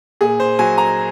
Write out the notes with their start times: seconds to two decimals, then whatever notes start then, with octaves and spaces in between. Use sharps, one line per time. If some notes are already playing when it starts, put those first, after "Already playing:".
0.21 A#2 G#4
0.40 C5
0.59 F#3 G#5
0.78 A#5